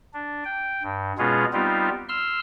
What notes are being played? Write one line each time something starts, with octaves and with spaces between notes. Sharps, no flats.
D4
G5
G2
B2 G#3 B3 C#4 F4 G#4
G3 B3 C4 D#4 F4 G4
C6 E6 F6